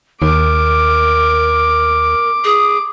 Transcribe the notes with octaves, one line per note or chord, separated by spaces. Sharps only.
D#2 A#4 D6
G#4